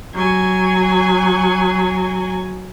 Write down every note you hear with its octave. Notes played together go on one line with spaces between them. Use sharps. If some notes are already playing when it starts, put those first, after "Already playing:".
F#3 G#5